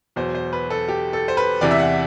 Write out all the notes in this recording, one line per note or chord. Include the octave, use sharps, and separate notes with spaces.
E2 B2 F#3 C5
C5
B4
A4
G4
A4
C5
B4
E2 C3 E3 D5
E5
F#5